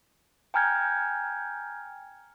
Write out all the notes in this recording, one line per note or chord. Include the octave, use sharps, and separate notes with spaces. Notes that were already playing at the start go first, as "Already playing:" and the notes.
G5 G#5 A#5 F6 G6 G#6